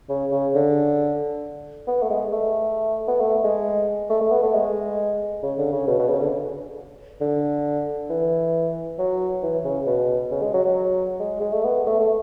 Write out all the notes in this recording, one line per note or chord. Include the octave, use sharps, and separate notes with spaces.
C#3
C#3
D3
B3
A3
G#3
A3
B3
A3
G#3
A3
A3
B3
A3
G#3
C#3
D3
C#3
B2
B2
C#3
D3
D3
E3
F#3
E3
C#3
B2
C#3
G#3
F#3
F#3
G#3
G#3
A3
B3
A3
A3